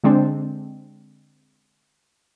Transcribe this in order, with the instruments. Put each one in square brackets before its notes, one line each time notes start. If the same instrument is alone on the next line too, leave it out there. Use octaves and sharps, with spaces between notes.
[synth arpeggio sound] D3 G#3 C4 D4